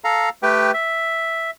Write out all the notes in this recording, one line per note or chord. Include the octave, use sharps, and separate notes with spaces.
A4 F5 A#5
A3 G4 B4 G5
E5